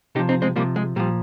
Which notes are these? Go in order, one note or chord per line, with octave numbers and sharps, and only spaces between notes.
C3 F3 D#4 G4
C4 D#4
G#3 C4
C3 F3 G3 A#3
G#3
A#2 F3 G3